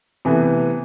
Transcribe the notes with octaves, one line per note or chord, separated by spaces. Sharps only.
C3 E3 A3 B3